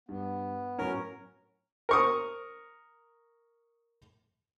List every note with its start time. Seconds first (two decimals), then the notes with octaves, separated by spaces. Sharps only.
0.09 G2 B3
0.78 A2 F#3 C#4 A#4
1.89 A#4 C#6 D#6